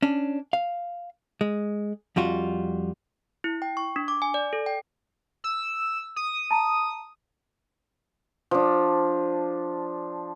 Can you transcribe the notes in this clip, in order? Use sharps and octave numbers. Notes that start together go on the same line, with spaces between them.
C#4 D4
F5
G#3
F2 G3 F4 F#4
E4
G5
C#6
D4
D6
G#5
D5
A4
G5
E6
D#6
A5 A#5
F3 D4